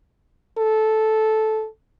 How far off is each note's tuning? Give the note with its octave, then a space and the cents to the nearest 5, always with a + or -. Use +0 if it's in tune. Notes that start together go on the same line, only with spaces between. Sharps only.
A4 -10